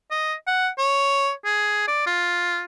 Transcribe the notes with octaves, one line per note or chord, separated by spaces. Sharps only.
D#5
F#5
C#5
G#4
D5
F4